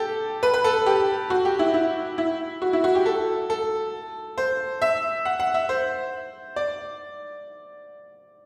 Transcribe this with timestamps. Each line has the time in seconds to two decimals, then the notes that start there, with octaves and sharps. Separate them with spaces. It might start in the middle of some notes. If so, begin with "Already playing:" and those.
Already playing: G4 A4
0.43 B4
0.54 B4
0.64 A4
0.86 G4
1.30 F#4
1.45 G4
1.59 E4
1.74 E4
2.18 E4
2.62 F#4
2.73 E4
2.84 F#4
2.95 G4
3.06 A4
3.50 A4
4.38 C5
4.82 E5
5.25 F#5
5.40 F#5
5.54 E5
5.69 C5
6.56 D5